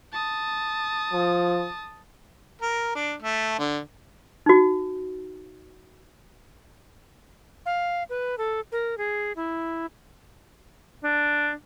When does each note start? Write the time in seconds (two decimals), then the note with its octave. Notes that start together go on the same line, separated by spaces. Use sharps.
0.13 A5 D#6
1.13 F3
2.62 A#4
2.95 D4
3.22 A3
3.59 D3
4.46 D#4 F#4
7.66 F5
8.09 B4
8.38 A4
8.72 A#4
8.98 G#4
9.36 E4
11.04 D4